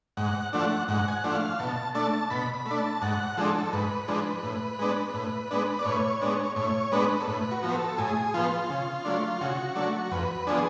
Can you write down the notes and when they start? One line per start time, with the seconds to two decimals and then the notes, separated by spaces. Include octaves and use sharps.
0.17 G#2 F#5
0.53 F3 A3 D4 F#5
0.88 G#2 F#5
1.08 G#5
1.13 F#5
1.24 F3 A3 D4
1.35 F5
1.59 B2 A5
1.94 A3 D4 A5
2.30 B2 B5
2.54 B5
2.66 A3
2.71 D4
2.78 A5
3.02 G#2 F#5
3.37 F3 G#3 D4 A4
3.73 G#2 B4
4.08 F3 G#3 D4
4.43 A2
4.79 G#3 B3 D4
5.14 A2
5.51 G#3 B3 D4
5.79 D5
5.85 A2 C#5
6.21 G#3 B3 D4
6.56 A2 C#5
6.92 G#3 B3 D4 B4
7.21 A4
7.27 A2 B4
7.51 F#4
7.63 F3 B3
7.75 A4
7.98 A2 G#4
8.34 F3 B3 F4
8.70 C#3
9.05 F#3 A3 D4
9.41 C#3 F#4
9.76 F#3 A3 D4
10.11 F2 B4
10.47 F3 B3 D4 G#4